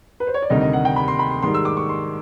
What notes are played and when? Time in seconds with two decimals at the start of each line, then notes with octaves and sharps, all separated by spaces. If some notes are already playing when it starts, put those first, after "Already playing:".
0.20 B4
0.27 C5
0.34 C#5
0.42 D5
0.50 D2 C3 D#3 G3 D#5
0.61 D#5
0.73 F#5
0.85 G5
0.96 B5
1.08 C6
1.19 B5
1.31 C6
1.42 G#2 D#3 G3 C6
1.54 E6
1.65 D6
1.77 C#6
1.89 C6